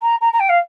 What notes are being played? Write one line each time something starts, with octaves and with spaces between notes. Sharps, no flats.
A#5
A#5
A#5
G5
F5